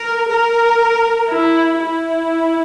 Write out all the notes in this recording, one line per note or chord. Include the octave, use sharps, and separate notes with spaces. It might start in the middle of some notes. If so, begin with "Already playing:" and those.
Already playing: A#4
A#4
E4
E4